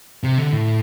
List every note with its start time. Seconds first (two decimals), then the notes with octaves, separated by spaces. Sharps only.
0.23 C3
0.38 D3
0.52 A2